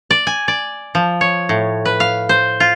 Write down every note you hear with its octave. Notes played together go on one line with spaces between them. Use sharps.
D5
G#5
D5
F3
C#5
A2
B4
F5
C5
F4